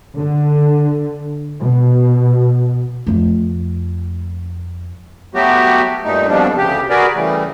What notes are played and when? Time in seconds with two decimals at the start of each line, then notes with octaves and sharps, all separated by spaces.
0.18 D3
1.60 B2
3.07 F2 A3
5.34 F#3 G3 A3 B3 F#4 G4
6.04 G2 A#2 A3 D#4
6.28 F2 B2 F3 G3 D4
6.57 D2 C#3 G4
6.90 F#4 G#4 A#4 B4 D5
7.15 C#3 E3 G3 A3